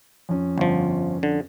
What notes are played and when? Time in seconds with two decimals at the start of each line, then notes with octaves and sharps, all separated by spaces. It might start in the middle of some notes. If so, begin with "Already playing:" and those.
0.29 F2 C#4
0.58 G1 F3
1.23 D3